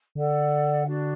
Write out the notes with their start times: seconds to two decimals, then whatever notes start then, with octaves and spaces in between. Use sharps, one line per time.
0.15 D3 A4 D5 F#5
0.85 D4 F#4 D5